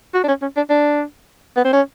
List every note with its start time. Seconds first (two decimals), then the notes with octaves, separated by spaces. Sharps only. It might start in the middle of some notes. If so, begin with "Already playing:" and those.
0.14 F#4
0.24 D4
0.28 C#4
0.42 C#4
0.57 D4
0.70 D4
1.56 B3
1.64 C4
1.73 C#4